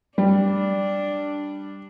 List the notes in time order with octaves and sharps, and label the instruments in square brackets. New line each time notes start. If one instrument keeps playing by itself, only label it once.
[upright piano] G3 [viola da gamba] D4